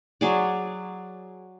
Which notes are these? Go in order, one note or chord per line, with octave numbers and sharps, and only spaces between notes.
F#3 G#4 D5